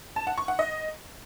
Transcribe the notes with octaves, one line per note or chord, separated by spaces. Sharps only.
A5
F#5
C#6
F#5
D#5